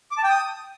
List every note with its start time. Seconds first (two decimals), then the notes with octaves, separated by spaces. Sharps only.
0.11 D6
0.18 A5
0.24 G5
0.30 D#6